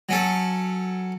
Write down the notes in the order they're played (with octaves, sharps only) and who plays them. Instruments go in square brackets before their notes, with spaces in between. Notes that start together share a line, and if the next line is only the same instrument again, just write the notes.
[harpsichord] F#3 C#4 A4